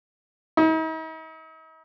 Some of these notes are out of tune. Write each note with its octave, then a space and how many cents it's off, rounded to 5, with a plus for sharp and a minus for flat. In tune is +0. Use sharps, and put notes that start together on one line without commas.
D#4 +45